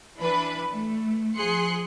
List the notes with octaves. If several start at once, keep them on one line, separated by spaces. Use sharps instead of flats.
E3 D4 B4 B5
A3
F3 G#4 C6 F#6 C#7